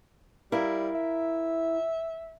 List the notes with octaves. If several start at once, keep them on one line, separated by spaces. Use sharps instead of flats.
G3 E4 A#4 F5
E5